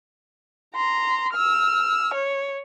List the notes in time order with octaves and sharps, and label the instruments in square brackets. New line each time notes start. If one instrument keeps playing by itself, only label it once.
[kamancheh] A#5 C6
E6 F6
C#5